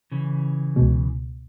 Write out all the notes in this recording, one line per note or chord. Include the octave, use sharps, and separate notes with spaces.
C#3 E3
C#2 B2